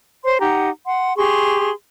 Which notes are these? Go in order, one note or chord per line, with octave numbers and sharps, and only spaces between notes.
C5 C#5 C6
D#4 G4 F#5 A#5
F#5 C6
G4 G#4 C6 C#6